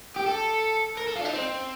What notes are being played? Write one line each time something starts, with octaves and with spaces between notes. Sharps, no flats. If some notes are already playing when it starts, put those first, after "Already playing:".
G4
A4
A#4
A4
F4
D4
D#4
C4